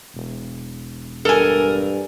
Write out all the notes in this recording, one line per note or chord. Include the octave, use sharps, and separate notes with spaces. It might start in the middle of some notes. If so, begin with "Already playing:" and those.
E1
G2 A4 A#4 G#5